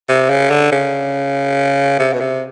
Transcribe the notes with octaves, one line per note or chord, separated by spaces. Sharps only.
C3
C#3
D3
C#3
C3
B2
C3